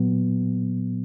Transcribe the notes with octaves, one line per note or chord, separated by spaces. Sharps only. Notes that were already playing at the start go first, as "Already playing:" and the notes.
Already playing: A#2 F#3 B3